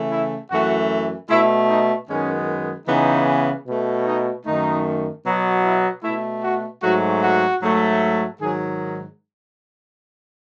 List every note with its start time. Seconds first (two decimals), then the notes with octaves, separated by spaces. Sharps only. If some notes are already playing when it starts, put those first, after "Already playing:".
Already playing: C#3 E3 A3
0.11 E4
0.51 F#2 E3 A3 F#4
1.30 B2 A3 E4
1.69 D#4
2.09 F#2 D#3 G#3 B3 C#4
2.88 C#3 E3 B3 D#4
3.67 B2 A3
4.06 D#4
4.46 F#2 D#3 A3 D#4
5.24 B2 F#3 B3
5.64 E4
6.04 B2 A3 E4
6.43 F#4
6.83 G#2 F#3 A3 F#4
7.22 F#4
7.62 G#2 F#3 A3
8.41 G#2 D#3 F#3 G#4